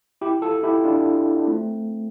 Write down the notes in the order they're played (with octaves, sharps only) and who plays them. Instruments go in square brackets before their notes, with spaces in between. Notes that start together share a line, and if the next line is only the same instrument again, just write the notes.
[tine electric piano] E4 G4
F4 A4
E4 G4
D4 F4
D4
A3 C4